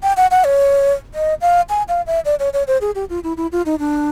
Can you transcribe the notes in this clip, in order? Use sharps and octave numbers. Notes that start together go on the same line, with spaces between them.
G5
F#5
F#5
C#5
D#5
F5
G#5
F5
E5
D5
C#5
C#5
C5
G#4
G4
F4
E4
E4
F4
D#4
D4